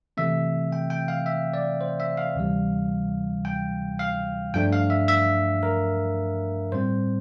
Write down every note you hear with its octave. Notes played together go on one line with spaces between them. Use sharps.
C3 E3 A3 C4 E5
G5
G5
F5
E5
D5
C5
E5
F5
D2 C3 E3 G3
G5
F5
G2 F3 A3 D4 G5
F5
E5
E5
A#4
A2 G3 C4 C5